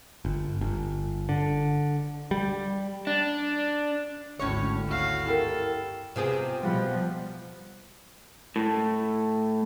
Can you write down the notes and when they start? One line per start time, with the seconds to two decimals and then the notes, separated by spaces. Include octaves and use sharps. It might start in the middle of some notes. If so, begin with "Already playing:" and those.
0.25 G1
0.61 G1
1.29 D3
2.31 G3
3.07 D4
4.39 G#1 D2 A2 C#4 C#5
4.88 G2 F#4 F5
5.25 E4 G4 A4 A#4
6.16 C3 B3 C4 F4 G4 G#4
6.63 B2 F3 G3 F#5 B5
8.56 A2